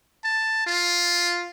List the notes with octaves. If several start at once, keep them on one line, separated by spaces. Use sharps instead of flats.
A5
F4